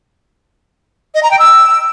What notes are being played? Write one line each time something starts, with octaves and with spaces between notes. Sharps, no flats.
D#5
A#5
G5
E6